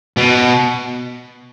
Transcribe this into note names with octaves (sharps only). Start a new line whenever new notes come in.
B2